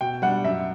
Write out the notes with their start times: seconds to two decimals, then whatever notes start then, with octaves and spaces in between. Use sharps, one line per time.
0.01 B2 G5
0.22 G3 D4 F#5
0.44 F#2 E5